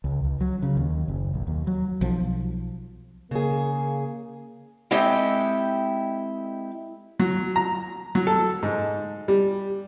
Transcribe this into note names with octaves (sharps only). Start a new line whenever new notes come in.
C#2
C#2
F#3
C#3
D#2
F#1
B1
D#2
F#3
B1 F3
C#3 A#3 G#4
G#3 C4 E4 G4 A4 D#5
F#3
A#5
F#3
A4
G#2
G3